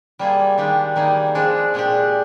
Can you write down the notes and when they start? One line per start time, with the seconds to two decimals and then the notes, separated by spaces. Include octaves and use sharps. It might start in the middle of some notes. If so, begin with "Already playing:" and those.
0.19 G3 A#3 F4 G#4
0.58 D#3 G#3 D4 G4
0.96 D#3 G3 A#3 D#4 G#4
1.35 F3 G#3 D4
1.74 A#2 G#3 D4 G4